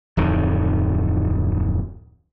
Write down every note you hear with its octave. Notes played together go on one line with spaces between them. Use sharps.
D1 F2 D#3